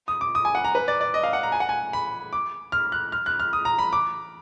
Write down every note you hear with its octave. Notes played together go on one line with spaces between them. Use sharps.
D#6
D6
D#6
G#5
F#5
A#5
B4
D5
D5
D#5
F5
F#5
A#5
G#5
F#5
G#5
B5
D6
F6
F#6
F6
F#6
F6
D#6
A#5
B5
D6